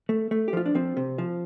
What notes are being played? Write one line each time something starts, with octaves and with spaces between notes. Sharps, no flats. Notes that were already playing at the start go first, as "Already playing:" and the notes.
A3
A3
G4
F3 F4
D4
F3 C4
C3
F3